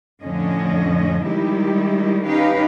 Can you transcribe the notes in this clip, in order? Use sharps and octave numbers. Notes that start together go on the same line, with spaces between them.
F2 A2 D3 F3 C#4 D#5
D#3 G3 G#3 D#4 E4 G4
C#4 D#4 G4 B4 F5